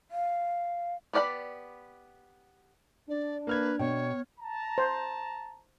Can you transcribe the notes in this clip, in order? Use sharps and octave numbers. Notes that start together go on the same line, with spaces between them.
F5
B3 G4 D5 F#5 B5
D4 D5
A#3 B4 F6 G#6
B2 C#5 G5
A5 A#5
C5